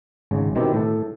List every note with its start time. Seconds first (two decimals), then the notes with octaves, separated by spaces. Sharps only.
0.31 G#1 C#3
0.55 B2 D#3 C4 E4 G4
0.74 A2 A4